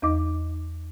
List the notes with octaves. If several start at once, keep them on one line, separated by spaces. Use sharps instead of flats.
E2 D#4 D#5 D6